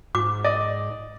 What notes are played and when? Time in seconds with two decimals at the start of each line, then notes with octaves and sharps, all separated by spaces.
0.15 G#2 D6
0.44 D5 D#5